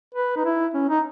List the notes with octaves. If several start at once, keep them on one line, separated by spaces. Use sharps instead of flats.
B4
D#4
E4
C#4
D#4